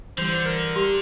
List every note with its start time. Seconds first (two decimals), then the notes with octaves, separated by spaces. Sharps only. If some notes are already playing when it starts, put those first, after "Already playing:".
0.18 D3 E3 G3 C5
0.45 A#4
0.76 G4